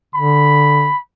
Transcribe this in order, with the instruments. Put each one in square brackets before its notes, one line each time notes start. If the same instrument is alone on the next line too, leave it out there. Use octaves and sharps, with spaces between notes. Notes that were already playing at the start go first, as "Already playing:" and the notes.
[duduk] D3 [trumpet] B5